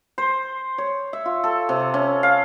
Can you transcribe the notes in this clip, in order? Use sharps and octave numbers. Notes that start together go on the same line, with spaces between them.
C5
C#5
E5
F4
A4
C3
C#4
F5